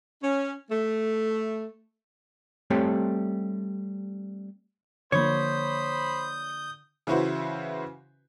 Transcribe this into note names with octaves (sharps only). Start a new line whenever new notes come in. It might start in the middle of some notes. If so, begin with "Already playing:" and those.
C#4
A3
G3 A3 C4 G4 A4 C#5
D3 F3 A#3 C5 C#5 B5 D#6 G6
C#3 E3 E4 F#4 B4 C5